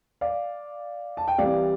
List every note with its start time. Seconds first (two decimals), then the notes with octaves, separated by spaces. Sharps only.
0.21 D5 F5
1.17 A5
1.28 G5
1.38 C2 C3 E3 G3 D5 F5